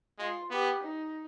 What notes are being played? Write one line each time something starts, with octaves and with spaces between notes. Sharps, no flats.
G#3 F4
B3 G4
D#4